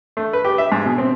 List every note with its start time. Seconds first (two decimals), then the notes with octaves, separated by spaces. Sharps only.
0.17 A3
0.33 B4
0.45 G4
0.58 E5
0.72 G#2
0.86 B2
0.98 C4